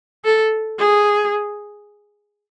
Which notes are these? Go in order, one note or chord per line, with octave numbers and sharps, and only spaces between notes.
A4
G#4